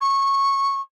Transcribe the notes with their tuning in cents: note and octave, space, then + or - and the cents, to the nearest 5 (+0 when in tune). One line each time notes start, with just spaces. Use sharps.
C#6 -15